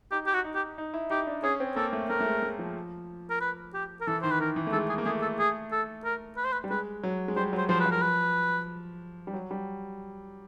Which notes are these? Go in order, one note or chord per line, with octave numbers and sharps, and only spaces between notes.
D#4 G4
G4
F#4
D#4
G4
D#4
E4
D#4 G4
D4
C#4 G#4
C4
A#3 A4
A3
A3 A#4
A3
G#3
A3
F3
A#4
B4
G4
A#4
E3 A4
D#3 C5
B4
D#3 A#4
E3
A3
G#3 A4
G#4
A#3
A3 G#4
A4
G#4
A4
A#4
B4
C5
B4
G3
G#3 B4
F#3
G#3
G3 C5
F#3
C5
F3 C5
B4
F3
A#4
B4
G3
F#3
G3